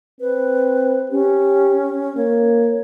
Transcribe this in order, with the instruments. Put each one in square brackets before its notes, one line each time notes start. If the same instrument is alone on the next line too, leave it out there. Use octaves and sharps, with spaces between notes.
[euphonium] C4 [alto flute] B4
[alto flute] C#4 [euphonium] G4
[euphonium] A#3 [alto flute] C#5